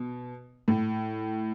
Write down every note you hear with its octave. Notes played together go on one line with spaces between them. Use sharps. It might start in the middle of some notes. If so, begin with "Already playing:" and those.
Already playing: B2
A2